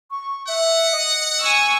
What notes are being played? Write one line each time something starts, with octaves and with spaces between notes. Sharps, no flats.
C#6
E5 F#5
D#5
G#5 C#6 E6